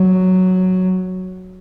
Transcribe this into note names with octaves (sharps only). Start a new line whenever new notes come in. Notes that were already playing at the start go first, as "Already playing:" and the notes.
Already playing: F#3